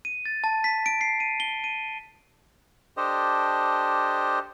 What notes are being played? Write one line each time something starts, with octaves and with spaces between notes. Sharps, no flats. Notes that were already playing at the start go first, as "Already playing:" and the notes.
D#7
A6
A5
B6
D7
C7
D#7
G7
D#7
D4 G4 A4 C5 D#5